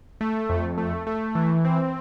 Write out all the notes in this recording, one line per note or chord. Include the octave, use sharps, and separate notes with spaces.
A3
F2
A3
A3
E3
C4